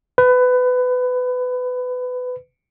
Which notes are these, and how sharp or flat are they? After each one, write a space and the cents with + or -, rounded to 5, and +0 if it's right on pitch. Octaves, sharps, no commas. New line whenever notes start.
B4 +20